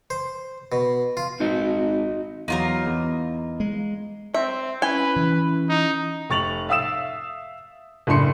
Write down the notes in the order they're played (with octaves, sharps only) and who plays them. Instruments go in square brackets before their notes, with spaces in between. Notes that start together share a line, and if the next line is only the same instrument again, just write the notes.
[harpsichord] C5
B2
F4
[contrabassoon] G#1 [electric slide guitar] D#4 F#4 D#5
[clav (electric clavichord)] E2 F#3 [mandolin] D#4 F4 A#4
[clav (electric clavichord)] E2
[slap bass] G#3
[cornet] C4 [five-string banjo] E5
[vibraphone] C#4 E4 [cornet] B4 [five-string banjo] G#5
[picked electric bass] E3
[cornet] D#4
[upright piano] F1 C#6 A6 F7 F#7
E5 F5 D#6 E6 E7
F#1 A2 D4 C6 C#7